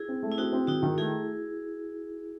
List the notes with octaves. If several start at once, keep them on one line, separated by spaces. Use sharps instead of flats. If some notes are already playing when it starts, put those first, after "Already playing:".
Already playing: E4 G#4
C4
A3
E4
C4 D#4 F#4
C4
D#3 D#4 F#4
D#3
A3 E4 G#4